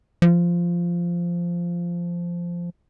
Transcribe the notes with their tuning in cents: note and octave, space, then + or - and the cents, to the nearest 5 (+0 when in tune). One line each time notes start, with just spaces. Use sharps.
F3 -10